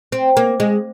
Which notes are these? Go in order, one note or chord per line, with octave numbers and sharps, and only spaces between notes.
C4
A#3
G#3